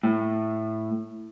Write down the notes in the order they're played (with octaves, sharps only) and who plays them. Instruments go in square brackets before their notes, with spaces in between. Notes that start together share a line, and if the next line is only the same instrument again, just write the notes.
[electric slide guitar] A2